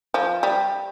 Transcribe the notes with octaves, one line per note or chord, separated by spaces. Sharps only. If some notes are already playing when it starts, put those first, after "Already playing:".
F3
G3